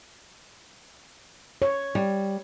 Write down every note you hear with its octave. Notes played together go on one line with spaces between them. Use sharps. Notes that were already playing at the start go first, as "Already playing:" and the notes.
C#5
G3